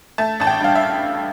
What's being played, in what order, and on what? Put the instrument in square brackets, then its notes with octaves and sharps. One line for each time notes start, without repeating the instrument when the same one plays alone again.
[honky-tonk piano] A3 A5
A1 A5
G5
G2 F5
E5